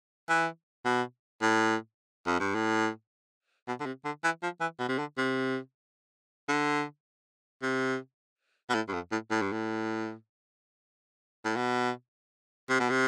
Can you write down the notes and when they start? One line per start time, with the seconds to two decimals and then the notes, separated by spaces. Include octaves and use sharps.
0.29 E3
0.85 B2
1.42 A2
2.26 F2
2.40 G2
2.55 A2
3.68 B2
3.80 D3
3.86 C3
4.05 D3
4.24 E3
4.43 F3
4.60 E3
4.79 B2
4.89 C3
4.99 D3
5.17 C3
6.48 D3
7.62 C3
8.70 B2
8.75 A2
8.88 G2
8.93 F2
9.12 A2
9.31 A2
9.42 G2
9.52 A2
11.45 A2
11.56 B2
12.69 C3
12.80 B2
12.90 C3